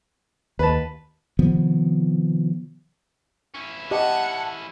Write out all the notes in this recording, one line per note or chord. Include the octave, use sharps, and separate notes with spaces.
D#2 B4 A5
C3 D#3 F3 B3
C#4 E4
G4 D#5 F#5 A5